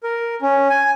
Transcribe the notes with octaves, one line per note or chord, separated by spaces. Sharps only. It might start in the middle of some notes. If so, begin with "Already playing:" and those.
A#4
C#4
G#5